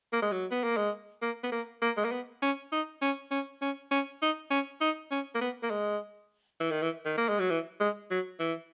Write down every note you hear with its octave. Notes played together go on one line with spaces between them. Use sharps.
A#3
G#3
F#3
B3
A#3
G#3
A#3
B3
A#3
A#3
G#3
A#3
B3
C#4
D#4
C#4
C#4
C#4
C#4
D#4
C#4
D#4
C#4
A#3
B3
A#3
G#3
E3
D#3
E3
D#3
A#3
G#3
F#3
E3
G#3
F#3
E3